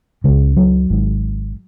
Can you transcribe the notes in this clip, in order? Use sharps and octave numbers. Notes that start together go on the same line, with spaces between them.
C#2 C#3 G#3
F#3
G#1 G#2